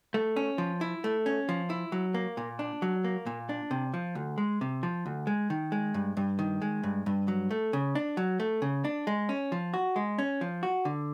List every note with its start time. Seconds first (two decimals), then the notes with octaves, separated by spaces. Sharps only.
0.14 A3
0.36 C#4
0.58 F3
0.81 E4
1.04 A3
1.26 C#4
1.49 F3
1.70 E4
1.92 F#3
2.14 A#3
2.37 A#2
2.59 D4
2.82 F#3
3.04 A#3
3.26 A#2
3.49 D4
3.71 C3
3.94 F3
4.15 D2
4.38 G#3
4.61 C3
4.83 F3
5.06 D2
5.27 G#3
5.50 D#3
5.72 G#3
5.94 G2
6.17 G2
6.39 D#3
6.62 G#3
6.83 G2
7.06 G2
7.28 F#3
7.51 A3
7.73 C#3
7.95 D4
8.17 F#3
8.40 A3
8.62 C#3
8.85 D4
9.07 G#3
9.29 C#4
9.52 F3
9.74 F#4
9.96 G#3
10.19 C#4
10.41 F3
10.63 F#4
10.85 D3